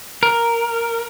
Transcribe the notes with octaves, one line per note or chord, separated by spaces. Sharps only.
A#4